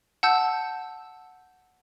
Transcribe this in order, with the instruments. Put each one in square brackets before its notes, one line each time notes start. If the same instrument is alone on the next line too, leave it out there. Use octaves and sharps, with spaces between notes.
[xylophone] F#5 A5 E6 G6